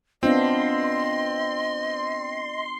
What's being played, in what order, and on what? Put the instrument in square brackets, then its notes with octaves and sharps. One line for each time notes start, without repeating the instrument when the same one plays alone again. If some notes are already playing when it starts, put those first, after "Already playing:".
[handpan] B3 D4 F4 [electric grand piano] C4 [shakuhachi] D#5 [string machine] C6